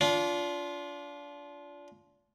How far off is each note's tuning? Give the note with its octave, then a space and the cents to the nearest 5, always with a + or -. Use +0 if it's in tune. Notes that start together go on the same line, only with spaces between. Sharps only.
D4 -30 F4 +0